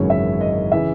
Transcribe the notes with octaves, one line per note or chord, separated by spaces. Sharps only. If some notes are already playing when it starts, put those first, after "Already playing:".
Already playing: G#1 F#2 C#3 E3 C#5
E5
D#5
C#3 E3 E5